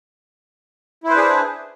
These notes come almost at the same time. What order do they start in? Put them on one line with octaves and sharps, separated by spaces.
E4 C5 B4 D4 G#4